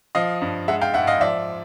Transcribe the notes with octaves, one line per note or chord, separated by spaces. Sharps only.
F3 D#5 F5
G2
G#3 E5 F#5
F5 G5
G#2 E5 F#5
D#5 F5
F3 D5 E5